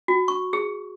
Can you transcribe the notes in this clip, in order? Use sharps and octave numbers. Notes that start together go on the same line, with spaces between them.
F#4
C#6
G#4